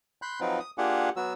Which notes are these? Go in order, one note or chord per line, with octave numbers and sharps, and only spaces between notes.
B5 C6 F#6 G6
F3 F#3 C4 D#4 F4 B4
D#6
A#3 D4 F4 G4 G#4 F#5
F#3 B3 F#4 E6